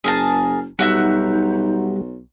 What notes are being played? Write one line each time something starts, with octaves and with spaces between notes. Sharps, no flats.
F#1 G#4 A#4 A5
B1 G3 D#4 F#4 E5 F#6